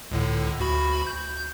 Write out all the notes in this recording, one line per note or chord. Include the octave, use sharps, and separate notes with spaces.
C#2 A2 D3
D2 F#4 B5
G6